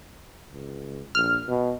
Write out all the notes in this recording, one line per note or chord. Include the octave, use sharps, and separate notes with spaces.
C#2
A#1 F6
B2